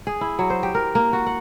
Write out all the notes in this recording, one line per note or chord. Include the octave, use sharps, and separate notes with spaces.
G#4
E4
F#3
C5
G4
A#4
A#3
F#4
F#5